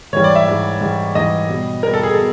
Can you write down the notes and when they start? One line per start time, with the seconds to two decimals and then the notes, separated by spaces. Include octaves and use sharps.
0.13 G#2 E3 G3 C#5
0.24 D5
0.35 E5
0.47 G#2 E3 G3
0.81 G#2 E3 G3
1.15 G#2 E3 G3 D#5
1.49 B2 G3
1.83 B2 G3 A#4
1.94 A4
2.03 G#4
2.14 B2 A4